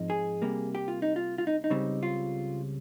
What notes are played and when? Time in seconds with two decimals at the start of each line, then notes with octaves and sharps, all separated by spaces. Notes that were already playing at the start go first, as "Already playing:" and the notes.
Already playing: G#2 F3 G#3 C4 D#4
0.10 G#4
0.42 C3 G3 A#3
0.75 G4
0.88 F4
1.02 D#4
1.16 F4
1.38 F4
1.47 D#4
1.64 D#4
1.70 C#2 C#3 G3 C4
2.03 F4